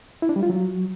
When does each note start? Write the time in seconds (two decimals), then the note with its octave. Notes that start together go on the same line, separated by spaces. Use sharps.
0.22 E4
0.29 D4
0.36 G3
0.43 F4
0.50 F#3